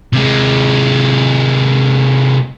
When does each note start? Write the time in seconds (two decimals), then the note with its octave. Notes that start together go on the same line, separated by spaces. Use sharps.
0.13 C3 G#3